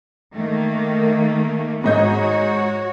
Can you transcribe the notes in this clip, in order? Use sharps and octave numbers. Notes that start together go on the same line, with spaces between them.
D#3 A3 A#3
G#2 F#4 C#5 D#5 G6